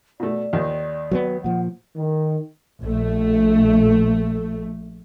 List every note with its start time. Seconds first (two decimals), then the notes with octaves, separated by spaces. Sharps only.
0.20 B2 A3 D5
0.53 D#2 D#3
1.11 F#3 A#3 B3
1.44 A#2 F3 F#5
1.96 D#3
2.82 A#1 A3